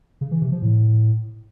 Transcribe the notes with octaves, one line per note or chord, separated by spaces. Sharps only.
C#3
E3
C3
F3
A2